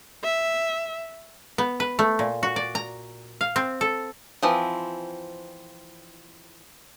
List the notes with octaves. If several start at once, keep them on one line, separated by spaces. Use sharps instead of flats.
E5
B3
B4
A3
A#2
F#4
D5
A#5
F5
C4
A4
E3 F3 C4